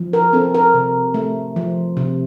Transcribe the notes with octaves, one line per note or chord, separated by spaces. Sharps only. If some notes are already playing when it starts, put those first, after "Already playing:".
Already playing: F3
A#4
C4 A4
A#4
C3
A3
F3
C3